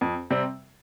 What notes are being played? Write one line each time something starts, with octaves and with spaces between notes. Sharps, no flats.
F2
C3 G3 C4